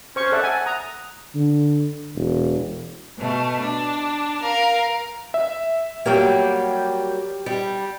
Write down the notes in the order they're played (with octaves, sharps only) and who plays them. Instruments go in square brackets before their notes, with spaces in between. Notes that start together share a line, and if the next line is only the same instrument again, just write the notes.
[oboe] C#4 [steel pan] C5 C#6
[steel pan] A4 D5 E5 [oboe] F#5
[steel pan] G#5
[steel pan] A#5 [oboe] D#6
[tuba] D3
E1
[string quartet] B2 A3
D4
A#4 F5
[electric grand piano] E5
[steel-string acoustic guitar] F#3 G3 A#3 [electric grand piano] G4 G5
[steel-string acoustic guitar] G3